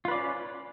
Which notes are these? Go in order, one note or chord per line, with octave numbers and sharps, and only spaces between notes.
C#4 F4 B4 C#5 D5